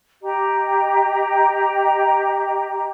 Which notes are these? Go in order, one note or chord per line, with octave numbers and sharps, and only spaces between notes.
G4 D#5 G5 A#5